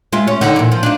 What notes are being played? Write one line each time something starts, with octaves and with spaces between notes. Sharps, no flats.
G#3 F4 E5
C#4
D3 D#4
A#2 E3
F3
D4 D#4 F4